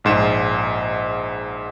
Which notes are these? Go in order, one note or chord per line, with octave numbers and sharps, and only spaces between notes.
A#1 G#2 E7